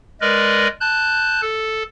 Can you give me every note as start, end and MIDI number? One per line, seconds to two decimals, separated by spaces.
0.21 0.68 56
0.21 0.68 70
0.21 0.68 71
0.21 0.68 74
0.21 0.68 75
0.80 1.41 81
0.80 1.41 90
0.80 1.41 91
1.42 1.83 69